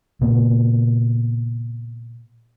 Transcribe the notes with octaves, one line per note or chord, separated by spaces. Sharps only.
A#2 C#3 A#3 B3